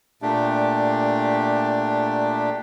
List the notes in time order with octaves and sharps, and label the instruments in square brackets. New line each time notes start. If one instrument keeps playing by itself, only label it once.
[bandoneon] A#2 A3 D4 G4